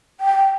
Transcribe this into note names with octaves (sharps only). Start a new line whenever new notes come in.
G5